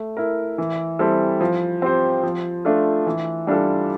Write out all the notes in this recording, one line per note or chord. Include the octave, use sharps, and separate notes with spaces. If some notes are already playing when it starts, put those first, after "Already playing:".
Already playing: A3
E4 A#4
E3
G3 C4 E4 A4
F3
C4 G4 C5
F3
A3 D4 F4 A4
E3
G3 D4 F4 A4